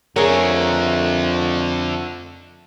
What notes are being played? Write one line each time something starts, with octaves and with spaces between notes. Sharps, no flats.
F2 D3 A3 G#4 A#4 C#5